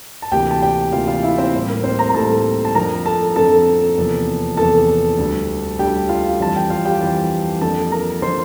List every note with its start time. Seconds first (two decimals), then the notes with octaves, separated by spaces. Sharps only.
0.22 A5
0.31 D2 C3 E3 A#3 G4 G5
0.51 A5
0.62 G4 G5
0.92 D2 C3 E3 A#3 F4 F5
1.08 F4 F5
1.23 E4 E5
1.38 C4 C5
1.54 A2 G3 A#3
1.68 A#4
1.84 C4 C5
1.99 A#4 A#5
2.09 A#5
2.14 A2 G3 A#3 A4 A5
2.65 A5
2.75 F2 D3 F3 C4 A#4 A#5
3.05 A4 A5
3.36 F2 D3 F3 C4 A4 A5
3.97 E2 C3 F3 A#3
4.57 E2 C3 F3 A#3 A4 A5
5.18 D2 D3 G3
5.79 D2 D3 G3 G4 G5
6.09 F4 F5
6.40 F2 E3 G3 C4 A5
6.56 G5
6.70 F4 F5
6.85 G4 G5
7.01 F2 E3 G3 C4
7.61 F2 D3 F3 A#3 A4 A5
7.92 A#4 A#5
8.22 D3 F3 A#3 C5 C6